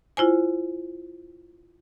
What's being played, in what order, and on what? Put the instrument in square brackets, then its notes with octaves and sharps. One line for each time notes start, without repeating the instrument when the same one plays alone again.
[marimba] E4 F4 C5 G#5